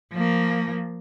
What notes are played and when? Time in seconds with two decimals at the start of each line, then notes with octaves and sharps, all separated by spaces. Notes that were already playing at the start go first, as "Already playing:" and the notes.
0.13 F3 A#3